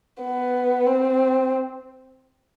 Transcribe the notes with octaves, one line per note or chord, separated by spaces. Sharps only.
B3
C4